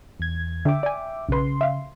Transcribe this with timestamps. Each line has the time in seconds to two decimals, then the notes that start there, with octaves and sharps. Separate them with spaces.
0.20 E2 G#6
0.65 D3 E5 G5 D6
0.83 D5 G#5
1.29 B1 C#3 B4 C6
1.61 E5 F5